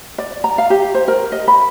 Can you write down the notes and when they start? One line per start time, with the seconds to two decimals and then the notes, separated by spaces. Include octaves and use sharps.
0.18 D5
0.44 A#5
0.58 F5
0.70 G4
0.94 C5
1.08 A#4
1.32 D#5
1.48 B5